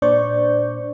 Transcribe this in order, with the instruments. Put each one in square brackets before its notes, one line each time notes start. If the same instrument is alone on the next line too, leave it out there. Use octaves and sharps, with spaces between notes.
[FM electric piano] A#2 D4 C5 D5 C#6 G6